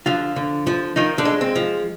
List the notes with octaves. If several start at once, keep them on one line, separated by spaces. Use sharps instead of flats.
D3 F3 F4
D3
F3
D#3 F3 D#4
D3 D4
G#3
C4
F3